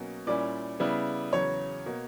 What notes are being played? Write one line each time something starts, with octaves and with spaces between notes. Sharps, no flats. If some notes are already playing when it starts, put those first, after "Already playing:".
Already playing: B2 F#3 A#3 C#4
A#2 G3 C#4 E4 D5
C#3 G3 B3 E4
E2 C#3 F#3 C#5
B2 A#3